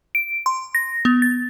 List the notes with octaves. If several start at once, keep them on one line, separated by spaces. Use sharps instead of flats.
D7
C6
A#6
B3
A6